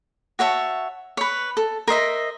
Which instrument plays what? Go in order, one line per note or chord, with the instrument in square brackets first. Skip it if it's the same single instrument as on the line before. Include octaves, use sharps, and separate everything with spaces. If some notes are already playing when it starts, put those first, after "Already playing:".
[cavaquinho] F#4 C#5 E5 A5
B4 C#5
A4
A#4 C5 D#5 E5